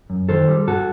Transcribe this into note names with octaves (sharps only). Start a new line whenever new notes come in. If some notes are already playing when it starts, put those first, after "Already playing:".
F#2
D#3 A4 C5
G3
G2 F#4 A4